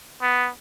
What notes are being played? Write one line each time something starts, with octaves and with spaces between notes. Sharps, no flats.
B3